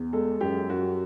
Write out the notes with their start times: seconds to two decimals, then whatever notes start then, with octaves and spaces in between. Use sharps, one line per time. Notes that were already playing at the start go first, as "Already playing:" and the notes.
Already playing: E2
0.13 G#3 A4
0.41 F#2 G4
0.69 F#2 F#4